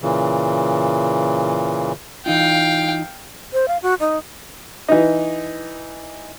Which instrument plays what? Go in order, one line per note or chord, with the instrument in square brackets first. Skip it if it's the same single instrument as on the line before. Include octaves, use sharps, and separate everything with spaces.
[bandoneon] A#2 C#3 E3
[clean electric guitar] E3 D#4 F4 [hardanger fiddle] F5 G5
[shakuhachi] C5
F5
F#4
D#4
[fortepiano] E3 D#4